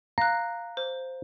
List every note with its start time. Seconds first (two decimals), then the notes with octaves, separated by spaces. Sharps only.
0.18 F5 A#5 F#6
0.77 C5